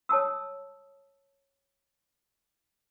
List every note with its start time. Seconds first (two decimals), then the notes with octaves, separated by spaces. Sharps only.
0.09 C#5 A5 D#6 E6